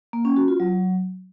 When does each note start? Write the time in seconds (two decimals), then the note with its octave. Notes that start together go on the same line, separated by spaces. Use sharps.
0.13 A#3
0.25 C#4
0.36 F#4
0.48 F4
0.60 F#3